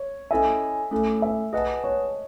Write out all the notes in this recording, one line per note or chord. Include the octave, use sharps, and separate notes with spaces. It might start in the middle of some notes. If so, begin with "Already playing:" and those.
Already playing: C#5
C#4 E4 A4 D#5 E5 G#5
A3 C#4 E4 A4
E5
G#4 B4 D#5 F#5 A5
C#5